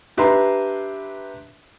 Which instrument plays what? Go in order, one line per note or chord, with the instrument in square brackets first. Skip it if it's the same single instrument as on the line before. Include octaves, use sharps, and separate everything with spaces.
[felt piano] D4 G4 B4 E5 A#5 C6